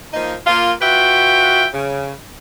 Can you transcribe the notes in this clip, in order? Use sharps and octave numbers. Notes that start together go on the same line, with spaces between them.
F3 A#3 D#4
A#3 F4
F4 F#4 B4 E5 G5
C#3